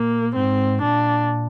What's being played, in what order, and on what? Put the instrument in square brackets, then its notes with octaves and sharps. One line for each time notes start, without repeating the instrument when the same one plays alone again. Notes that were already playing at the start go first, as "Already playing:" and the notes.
Already playing: [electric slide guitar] A#2 [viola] A#3
[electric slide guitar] G#2 [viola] C4
[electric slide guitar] A#2 [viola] D4